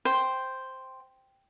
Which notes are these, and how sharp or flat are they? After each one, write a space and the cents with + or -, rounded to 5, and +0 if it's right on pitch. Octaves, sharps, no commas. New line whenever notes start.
C5 +0 G5 +0